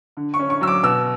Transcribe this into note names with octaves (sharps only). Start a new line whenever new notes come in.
D3
C#6
C#4
C#6
F#3 E6
D6
B2 E6